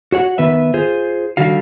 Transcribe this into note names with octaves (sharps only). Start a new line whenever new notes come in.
F#4 C#5 F#5
D#3 B3 B4 E5
F4 G#4 C5
D3 D#3 G3 F#4 F5